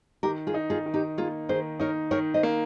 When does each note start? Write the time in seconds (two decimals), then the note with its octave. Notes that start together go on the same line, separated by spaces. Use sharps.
0.23 D#3 G4 A#4
0.47 F4 G#4
0.54 D#4
0.70 F4 G#4
0.86 D#3
0.94 D#4 G4
1.18 A#3 F4 G#4
1.49 D#3 G#4 C5
1.80 D#4 A#4 C#5
2.11 D#3 A#4 C#5
2.34 C5 D#5
2.43 A#3